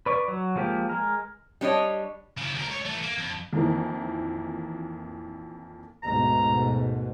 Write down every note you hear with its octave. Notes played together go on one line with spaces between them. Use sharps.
B4 D5 C#6
F#3
F3 G#3 A#3 G4
G#3 A#4
G3 D4 C#5 D#5
C#3 E4
D2 A#4
C#2 C#5
E3 A3
A#3
F2
F2 A#2 D#3 E3 A#3 E4
D2 G#2 B2 A#5